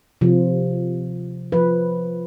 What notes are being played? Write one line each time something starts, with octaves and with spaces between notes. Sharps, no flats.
C3 F3
F3 B4